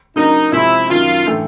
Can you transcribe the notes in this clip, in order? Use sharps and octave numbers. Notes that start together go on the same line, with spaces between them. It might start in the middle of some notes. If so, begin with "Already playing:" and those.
C#3 F#3 A#3 D4 D#4
C3 F3 G#3 C4 E4
F#2 D#3 F#3 F4
A2 E3 A3 D4